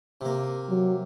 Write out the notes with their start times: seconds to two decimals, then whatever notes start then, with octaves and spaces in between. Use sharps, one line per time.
0.21 C3 A#3
0.69 F#3